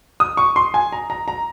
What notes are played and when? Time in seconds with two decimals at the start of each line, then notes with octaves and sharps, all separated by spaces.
0.20 D#6
0.37 C#6
0.56 C6
0.74 G#5
0.92 A#5
1.10 A#5
1.28 A#5